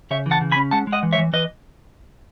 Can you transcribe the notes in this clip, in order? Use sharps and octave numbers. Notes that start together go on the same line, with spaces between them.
C#3 C#5 E5
E3
F#5 A5
C#3
G#5 B5
C#4
G#3 F#5 A5
G#3
D#5 F#5
E3
C#5 E5
E3
E3 B4 D#5